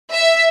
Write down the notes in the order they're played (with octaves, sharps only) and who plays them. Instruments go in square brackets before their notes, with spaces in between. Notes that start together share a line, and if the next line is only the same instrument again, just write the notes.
[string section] E5